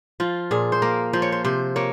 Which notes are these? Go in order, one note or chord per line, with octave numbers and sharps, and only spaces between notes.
F3 F4
A#2 G#4
C5
A#3 A#4
F3 C5
C#5
C5
C3 C5
A#3 C#5